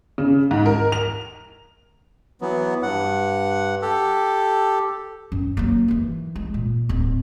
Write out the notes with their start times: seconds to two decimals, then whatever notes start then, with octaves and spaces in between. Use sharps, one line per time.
0.18 C#3
0.51 G#2
0.66 A#4
0.92 F7
2.41 E3 F#3 B3
2.83 G2 F#5
3.82 G4 A4
5.32 F#2
5.57 F#3 A#3
5.88 D#3 E3
6.36 G#3
6.54 A#2
6.89 D1